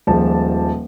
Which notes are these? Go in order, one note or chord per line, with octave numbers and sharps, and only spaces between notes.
D#1 F3 G#3 A5